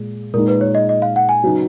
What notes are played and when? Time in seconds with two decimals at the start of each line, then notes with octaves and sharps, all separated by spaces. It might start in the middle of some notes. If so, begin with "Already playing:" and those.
Already playing: A#2 G#3
0.33 A#2 G#3 D#4 A#4
0.48 B4
0.61 C#5
0.75 D#5
0.89 D#5
1.02 F5
1.16 F#5
1.29 G#5
1.44 C#3 F#3 B3 D#4